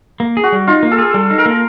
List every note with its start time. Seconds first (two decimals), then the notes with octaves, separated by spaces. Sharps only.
0.20 A#3
0.37 G#4
0.43 F#4
0.52 G3
0.67 D#4 F4
0.83 A#3
0.91 A4
0.98 G#4
1.14 G3 A4
1.30 D#4
1.38 A#4
1.46 A#3